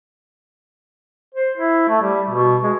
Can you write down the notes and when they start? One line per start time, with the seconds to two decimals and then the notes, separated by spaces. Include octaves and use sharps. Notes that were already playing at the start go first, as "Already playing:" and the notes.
1.34 C5
1.57 E4
1.89 A3
2.02 G3
2.30 B2
2.63 G#3